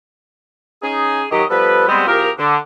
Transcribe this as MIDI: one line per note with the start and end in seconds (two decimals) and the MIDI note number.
0.83 1.25 61
0.83 1.25 63
0.83 1.25 68
1.31 1.43 39
1.31 1.43 54
1.31 1.43 67
1.31 1.43 75
1.49 1.84 53
1.49 1.84 55
1.49 1.84 59
1.49 1.84 69
1.49 1.84 71
1.88 2.06 55
1.88 2.06 56
1.88 2.06 59
1.88 2.06 60
2.07 2.30 36
2.07 2.30 65
2.07 2.30 67
2.07 2.30 68
2.07 2.30 70
2.38 2.58 50